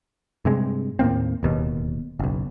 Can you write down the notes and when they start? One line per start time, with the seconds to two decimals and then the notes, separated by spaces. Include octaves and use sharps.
0.45 G2 C3 G#3
0.99 D#2 A2 A#3 C4
1.43 D1 D#2 B2
2.19 F#1 B1